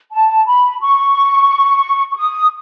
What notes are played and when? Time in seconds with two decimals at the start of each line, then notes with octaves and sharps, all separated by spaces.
0.12 A5
0.46 B5
0.81 C#6
2.11 C#6
2.16 D#6